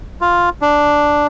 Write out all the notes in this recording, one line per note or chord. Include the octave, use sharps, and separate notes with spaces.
F4
D4